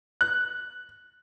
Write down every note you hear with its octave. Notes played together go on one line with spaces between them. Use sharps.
F#6